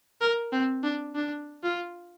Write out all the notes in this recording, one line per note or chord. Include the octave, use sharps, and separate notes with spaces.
A#4
C4
D4
D4
F4